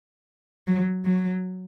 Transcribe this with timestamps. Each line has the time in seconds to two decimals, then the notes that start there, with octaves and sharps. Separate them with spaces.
0.67 F#3
1.06 F#3